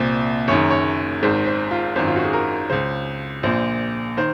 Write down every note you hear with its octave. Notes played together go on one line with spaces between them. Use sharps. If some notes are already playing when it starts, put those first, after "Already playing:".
Already playing: C2 A#2 C5
F#1 F#2 D#3 C#5
C#5
G#1 G#2 D#3 C5
C5
F4
G#1 F#2 D#3 C5
F4
F#4
G#4
A#4
C#2 C#3 C5
A#1 A#2 C5
D#3 C5